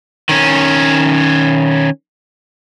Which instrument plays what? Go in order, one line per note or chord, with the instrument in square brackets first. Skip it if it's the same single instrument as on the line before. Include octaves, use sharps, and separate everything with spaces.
[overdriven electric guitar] D#3 C#4